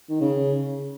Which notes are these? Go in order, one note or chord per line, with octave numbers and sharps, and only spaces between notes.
D#3
C#3